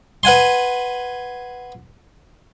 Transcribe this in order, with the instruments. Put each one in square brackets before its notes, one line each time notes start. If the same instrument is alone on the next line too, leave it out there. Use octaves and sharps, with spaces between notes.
[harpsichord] B4 F#5 G#5 C6